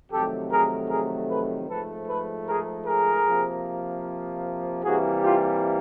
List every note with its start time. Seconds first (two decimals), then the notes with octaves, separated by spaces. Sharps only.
0.10 F2 C3 D#3 F#3 A3 G4 A4
0.51 G#4 A#4
0.89 G#4 A#4
1.29 A4 B4
1.68 G#2 F3 A3 A4 B4
2.08 A4 B4
2.47 G#4 A#4
2.87 G#4 A#4
3.26 C3 F3 A#3
4.83 C3 E3 G3 A#3 F#4 G#4
5.23 F4 G4